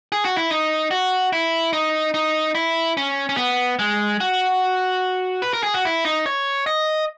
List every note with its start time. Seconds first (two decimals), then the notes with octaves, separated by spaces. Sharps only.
0.12 G#4
0.25 F#4
0.37 E4
0.50 D#4
0.91 F#4
1.33 E4
1.73 D#4
2.14 D#4
2.55 E4
2.97 C#4
3.29 C#4
3.37 B3
3.79 G#3
4.20 F#4
5.42 B4
5.53 A#4
5.63 G#4
5.74 F#4
5.85 E4
6.05 D#4
6.26 C#5
6.66 D#5